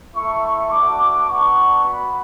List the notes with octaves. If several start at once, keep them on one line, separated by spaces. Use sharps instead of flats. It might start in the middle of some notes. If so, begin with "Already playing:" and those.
A3 E4 C#6
C#6
A3 D4 F#4 D6
B3 D4 F#4 C#6
B3 F#4 B5